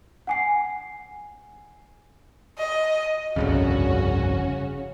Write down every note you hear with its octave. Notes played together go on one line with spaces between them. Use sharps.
F#5 G#5 C7
D#5
G1 C2 F2 C#3 C#4 F#4